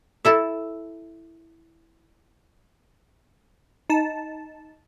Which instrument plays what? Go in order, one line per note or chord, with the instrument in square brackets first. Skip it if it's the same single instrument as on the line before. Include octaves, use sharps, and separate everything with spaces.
[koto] E4 A4 E5
[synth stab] D#4 A5